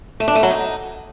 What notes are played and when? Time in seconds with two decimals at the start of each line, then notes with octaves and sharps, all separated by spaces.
0.20 A3
0.28 D4
0.35 A3
0.43 F#3
0.51 D#4